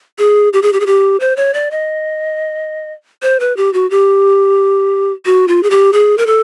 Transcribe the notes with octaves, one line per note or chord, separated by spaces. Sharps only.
G#4
G4
G#4
G4
G#4
G4
C5
C#5
D5
D#5
C5
B4
G4
F#4
G4
F#4
F4
G#4
G4
G#4
A#4
A4